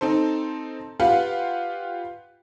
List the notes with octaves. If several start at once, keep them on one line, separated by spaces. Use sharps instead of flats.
C4 D#4 A4 C5
F4 G4 B4 F5 F#5